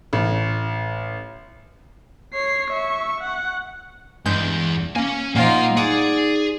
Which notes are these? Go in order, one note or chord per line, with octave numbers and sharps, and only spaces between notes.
A1
C#5 C7
E5 C#6
F#5
E2 G2 G#3 G6
A#3 C#4 G#5
A#2 F3 A#3 D#4 F4 F#5 C6
D#4 G#4 D5 F#5